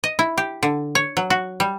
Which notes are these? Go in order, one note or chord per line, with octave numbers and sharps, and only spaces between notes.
D#5
E4
G4
D3
C#5
F#3
F#4
G3